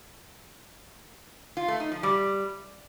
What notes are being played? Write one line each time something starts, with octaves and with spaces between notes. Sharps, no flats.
F4
A3
D#4
F3
G3